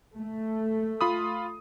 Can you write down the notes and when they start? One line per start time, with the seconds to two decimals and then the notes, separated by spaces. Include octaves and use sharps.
0.16 A3
1.01 F4 B5 D#6